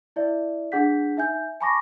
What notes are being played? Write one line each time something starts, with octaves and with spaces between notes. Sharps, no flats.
E4 D5 E5
D4 G#4 F#5 G6 B6
D#4 E5 G#5 G6
G#5 A5 B5 C#6 D6 A#6